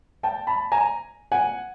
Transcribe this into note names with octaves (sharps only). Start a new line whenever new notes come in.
G5 A5
A5 B5
G#5 A#5
F#5 G#5